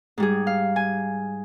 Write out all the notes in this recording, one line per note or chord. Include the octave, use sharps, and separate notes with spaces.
G#2 G3 G#4
F5
G#5